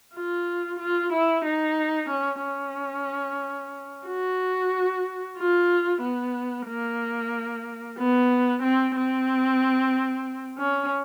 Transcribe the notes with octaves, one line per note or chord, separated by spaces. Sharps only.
F4
F4
E4
D#4
C#4
C#4
F#4
F4
B3
A#3
B3
C4
C4
C#4